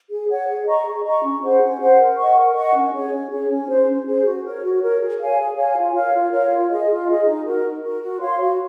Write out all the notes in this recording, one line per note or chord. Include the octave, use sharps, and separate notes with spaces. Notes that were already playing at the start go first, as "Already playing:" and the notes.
G#4
C#5 F#5
G#4
D#5 A#5 C#6
G#4
D#5 A#5 C#6
C#4
G#4 C5 F#5
C#4
G#4 C5 F#5
A#4
D#5 F#5 C#6
A#4
D#5 F#5 C#6
C#4
G#4 C#5
C#4
G#4 C#5
C#4
G#4 C5
C#4
G#4 C5
F#4
A#4 C#5
F#4
A#4 C#5
G#4
C#5 F5 G#5
G#4
C#5 F5 G#5
F4
A#4 C#5 F5
F4
A#4 C#5 F5
F4
G#4 D#5
F4
G#4 D#5
D#4
F#4 A#4
D#4
F#4 A#4
F#4
C#5 F5 C6
F#4